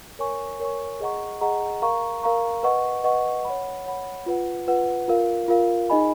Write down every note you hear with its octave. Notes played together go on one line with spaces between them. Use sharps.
A#4 C#5 G#5 C#6
A#4 C#5 G#5 C#6
G#4 D#5 F#5 A#5 C#6
G#4 D#5 F#5 A#5 C#6
A#4 F5 A#5 C#6
A#4 F5 A#5 C#6
B4 D#5 F#5 C#6
B4 D#5 F#5 C#6
C#5 F#5 B5
C#5 F#5 B5
F4 B4 F#5
F4 B4 F#5
F4 A#4 F5
F4 A#4 F5
D#4 G#4 D#5 G#5 B5